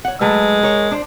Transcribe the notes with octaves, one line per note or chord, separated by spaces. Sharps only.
C#5 F#5
F#3 G#3 A3 B4
A#4 C#5
D4 C5